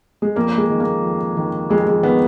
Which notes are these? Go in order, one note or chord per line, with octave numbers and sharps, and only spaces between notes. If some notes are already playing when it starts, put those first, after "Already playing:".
G#3
F2 A#3
G#3
D#3
A#3
F2
D#3
F2 G#3
G#3
D#3 B3